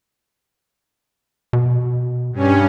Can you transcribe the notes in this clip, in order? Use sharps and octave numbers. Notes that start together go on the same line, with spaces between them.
B2
G2 C#4